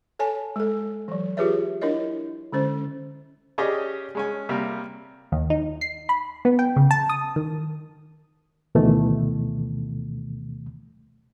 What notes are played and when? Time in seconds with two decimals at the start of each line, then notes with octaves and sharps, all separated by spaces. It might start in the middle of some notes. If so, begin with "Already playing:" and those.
0.19 A4 C#5 G#5 A5
0.56 G#3 A4
1.08 E3 F#3
1.37 F4 G4 G#4 B4 C#5 E5
1.81 D4 E4 A#4 C#5 D#5
2.52 D3 G#3 C#4 C5
3.58 C#4 G4 G#4 D5 D#5
4.15 G#3 C#4 G#5
4.49 C3 G3 A#3
5.32 D#2
5.50 D#4
5.81 C7
6.09 B5
6.45 B3
6.59 G5
6.76 C#3
6.91 A5
7.09 D#6
7.36 D#3
8.75 D2 B2 D#3 E3 A3